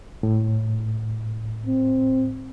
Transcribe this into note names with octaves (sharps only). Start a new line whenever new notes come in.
A2
C4